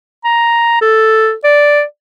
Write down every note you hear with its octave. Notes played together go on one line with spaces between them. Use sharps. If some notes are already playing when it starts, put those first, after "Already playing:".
A#5
A4
D5